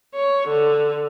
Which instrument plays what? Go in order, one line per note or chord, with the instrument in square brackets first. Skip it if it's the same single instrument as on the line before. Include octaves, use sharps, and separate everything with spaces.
[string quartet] C#5
D3